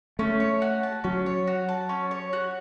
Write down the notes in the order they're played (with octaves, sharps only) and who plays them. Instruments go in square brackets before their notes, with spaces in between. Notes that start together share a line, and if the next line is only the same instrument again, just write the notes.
[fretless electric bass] A3 [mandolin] C#4
[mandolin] C#5
F#4
A5
[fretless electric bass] F#3 [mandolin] C#4
[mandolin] C#5
F#4
A5
C#4
C#5
F#4